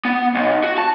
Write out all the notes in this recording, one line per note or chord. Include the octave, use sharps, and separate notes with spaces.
B3
B1
F#4
A5